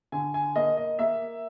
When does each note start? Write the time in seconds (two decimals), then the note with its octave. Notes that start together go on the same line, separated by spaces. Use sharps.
0.12 D3 G#5
0.34 G#5
0.56 A#3 D#5
0.77 D#5
0.99 A#3 E5